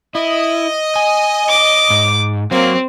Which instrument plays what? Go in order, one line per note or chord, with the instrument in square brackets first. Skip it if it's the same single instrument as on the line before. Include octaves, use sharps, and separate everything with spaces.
[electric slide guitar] E4 [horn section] D#5
[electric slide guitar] G#5
[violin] D6
[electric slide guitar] G#2
[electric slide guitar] F#3 [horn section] A#3 [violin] C4